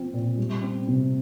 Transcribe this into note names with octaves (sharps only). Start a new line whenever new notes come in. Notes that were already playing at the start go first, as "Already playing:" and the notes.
Already playing: F3 C4
A#2
G3
C4
C3